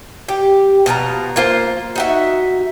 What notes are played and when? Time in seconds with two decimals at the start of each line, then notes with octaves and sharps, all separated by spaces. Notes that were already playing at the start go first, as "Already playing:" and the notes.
0.29 G4
0.86 B2 F3 G4 A#5
1.36 A#3 F4 C5
1.96 D#4 F#4 E5